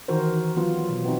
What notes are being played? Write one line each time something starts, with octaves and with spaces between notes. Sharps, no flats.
D#3 E3 F#4 A#4 C5
F#3 B3 F4
B2
B3 C4 D#4 F#4